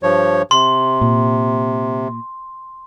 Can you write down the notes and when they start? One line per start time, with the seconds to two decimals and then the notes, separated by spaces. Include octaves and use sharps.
0.03 G2 F3 C#5
0.51 C3 C6
1.01 A#2